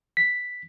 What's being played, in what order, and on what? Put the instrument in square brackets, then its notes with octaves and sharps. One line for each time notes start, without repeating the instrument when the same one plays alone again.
[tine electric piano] B6